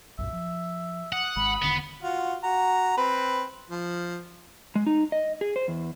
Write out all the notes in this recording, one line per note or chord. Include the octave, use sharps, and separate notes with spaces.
B1 F#2 A#2 E5
F3
F#5 D#6
G#1 G#3 B5
E1 D3 D#3 B3
F4 F#4
F#4 A#5
C4 B4
F3
G#3
D#4
D#5
G#4
C5
E2